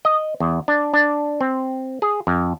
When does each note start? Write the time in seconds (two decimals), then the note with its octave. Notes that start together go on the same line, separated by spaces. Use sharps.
0.05 D#5
0.40 E2
0.68 D4
0.94 D4
1.41 C4
2.02 G#4
2.27 F2